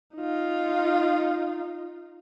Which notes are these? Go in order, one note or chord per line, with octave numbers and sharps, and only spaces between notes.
D#4 F4